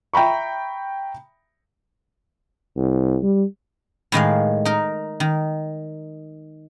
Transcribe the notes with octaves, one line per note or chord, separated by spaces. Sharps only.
E5 G5 A#5 B5 C#6
C2
G3
A2 D#3 G#3 F5
D#4 A#4
D#3